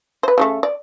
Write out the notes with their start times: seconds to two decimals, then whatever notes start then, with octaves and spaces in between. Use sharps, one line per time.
0.23 B4 C5
0.38 C#3 F#3 A3
0.63 D5